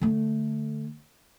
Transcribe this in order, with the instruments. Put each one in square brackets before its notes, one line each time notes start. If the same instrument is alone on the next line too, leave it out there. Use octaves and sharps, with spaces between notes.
[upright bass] D3 A3